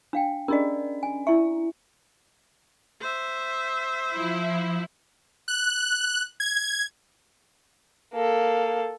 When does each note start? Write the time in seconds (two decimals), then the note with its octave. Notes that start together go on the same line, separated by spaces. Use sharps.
0.13 D4 F5 G5
0.48 C#4 D4 A#4 D5 D#5
1.03 G#5
1.27 E4 E5 C#6
3.01 C5 E5
4.13 F3 E4
5.48 F#6
6.40 G#6
8.14 A#3 A4